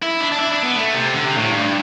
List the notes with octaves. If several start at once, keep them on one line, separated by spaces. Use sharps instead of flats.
E4
D4
D4
E4
D4
B3
A3
C3
D3
C3
A2
G2